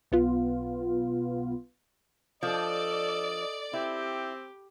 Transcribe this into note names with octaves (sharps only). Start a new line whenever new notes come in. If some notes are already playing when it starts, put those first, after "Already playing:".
B1 B3 F4
F3 D4 A4 D5 D#5
C4 E4 G4